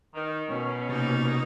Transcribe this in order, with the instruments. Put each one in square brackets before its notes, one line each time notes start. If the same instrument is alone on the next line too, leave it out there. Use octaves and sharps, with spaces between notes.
[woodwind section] D#3
[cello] B2 [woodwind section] C#4
[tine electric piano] C3 C4 A6 [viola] A#3 D#4